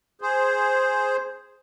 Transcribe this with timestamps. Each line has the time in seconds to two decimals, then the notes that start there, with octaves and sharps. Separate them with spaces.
0.21 G#4 C5